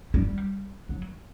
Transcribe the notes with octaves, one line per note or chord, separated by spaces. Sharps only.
G3
F#3